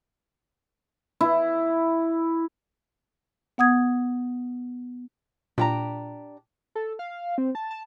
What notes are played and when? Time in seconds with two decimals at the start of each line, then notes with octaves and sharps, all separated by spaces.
1.21 E4
3.58 B3 F#5 D#6 G#6
5.58 A#2 D4 G4 A#5
6.75 A4
6.99 F5
7.38 C4
7.55 A5
7.71 A5